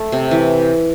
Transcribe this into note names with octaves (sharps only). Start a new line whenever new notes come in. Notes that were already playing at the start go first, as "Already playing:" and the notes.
Already playing: A3
C3
E3